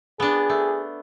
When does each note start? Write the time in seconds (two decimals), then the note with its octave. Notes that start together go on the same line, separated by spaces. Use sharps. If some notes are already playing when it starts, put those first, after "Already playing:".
0.20 B3 D4 G#4
0.49 A3